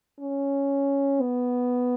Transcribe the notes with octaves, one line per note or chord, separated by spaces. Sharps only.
C#4
B3